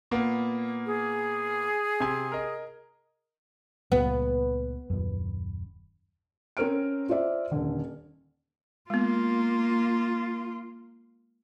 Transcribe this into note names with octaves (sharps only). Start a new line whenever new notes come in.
A#2 A#3 B3
G#4
C3 G#5
A#4 D#5
C#2 A#2 G3 B3
D#1 F#2
C4 C#4 A#4 C5 F6 D7
F4 C5 D5 E5
D#1 D3
G#3 A#3 B3 F4